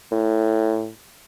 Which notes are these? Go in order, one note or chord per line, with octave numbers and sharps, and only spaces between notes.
A2